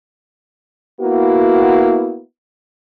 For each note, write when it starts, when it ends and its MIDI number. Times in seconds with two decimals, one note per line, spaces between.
1.01 2.20 58
1.01 2.20 59
1.01 2.20 64
1.01 2.20 66